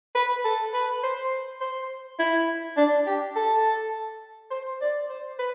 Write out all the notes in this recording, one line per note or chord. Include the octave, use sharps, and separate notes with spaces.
B4
A4
B4
C5
C5
E4
D4
G4
A4
C5
D5
C5
B4